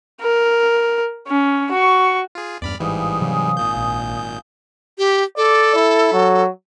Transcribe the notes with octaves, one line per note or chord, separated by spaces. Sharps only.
A#4
C#4
F#4 C#6
F4 G#4
E2 G2 D5 B5 F6
A1 G#2 E3 G3 F5 G#5 D#6
C3 E3 F#3
G#1 A#2 G6
A#1
G4
A4 D5
E4
F#3